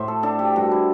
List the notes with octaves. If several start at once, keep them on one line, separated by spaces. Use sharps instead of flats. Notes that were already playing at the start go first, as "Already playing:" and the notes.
Already playing: A2 C5 E5
A4
D4 A4
G4
G2 F#4
E4